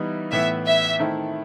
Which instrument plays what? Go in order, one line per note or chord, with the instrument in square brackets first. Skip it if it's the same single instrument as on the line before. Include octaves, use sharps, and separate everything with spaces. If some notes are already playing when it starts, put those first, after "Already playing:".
Already playing: [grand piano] E3 G3 B3 D#4
[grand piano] A2 E3 B3 [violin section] E5
[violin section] E5
[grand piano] D#3 A3 C4 E4